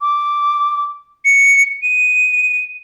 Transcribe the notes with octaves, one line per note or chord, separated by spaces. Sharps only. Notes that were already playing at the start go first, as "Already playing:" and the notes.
D6
C#7
D#7